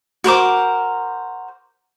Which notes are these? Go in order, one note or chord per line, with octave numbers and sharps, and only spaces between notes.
F#4 A#4 C5 D6